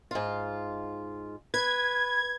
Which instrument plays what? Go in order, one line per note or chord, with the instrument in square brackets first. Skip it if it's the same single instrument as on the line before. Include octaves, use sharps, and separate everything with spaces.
[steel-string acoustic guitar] G#2 F4
[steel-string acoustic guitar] B4 [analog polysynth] G#6